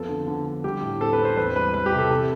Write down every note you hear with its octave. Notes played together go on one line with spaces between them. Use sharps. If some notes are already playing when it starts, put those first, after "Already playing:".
Already playing: F2 B3 A4
D3
D3
D3
G3 G4
A2
C4 A4
B4
C4
C5
E2 B4
G3 B4
G3 B4
G4
C3
A4
C3